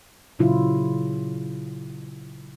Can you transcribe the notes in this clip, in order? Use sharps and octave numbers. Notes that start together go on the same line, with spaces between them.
A#2 C#3 F#3 E4 F4